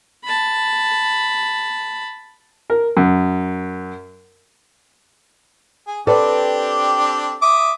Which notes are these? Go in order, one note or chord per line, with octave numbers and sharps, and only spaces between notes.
A5 B5
A#4
F#2
G#4
C4 D4 G4 A4 B4 D5
E5 D6 D#6